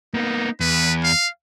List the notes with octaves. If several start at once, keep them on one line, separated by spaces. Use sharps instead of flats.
A#3 B3 D#4
E2 B4
F5